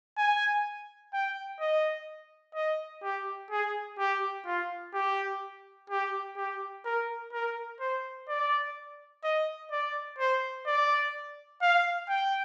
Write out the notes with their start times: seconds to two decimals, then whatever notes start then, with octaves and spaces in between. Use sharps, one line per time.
0.18 G#5
1.13 G5
1.60 D#5
2.55 D#5
3.03 G4
3.51 G#4
3.99 G4
4.46 F4
4.94 G4
5.90 G4
6.37 G4
6.85 A#4
7.33 A#4
7.80 C5
8.29 D5
9.24 D#5
9.72 D5
10.19 C5
10.66 D5
11.61 F5
12.09 G5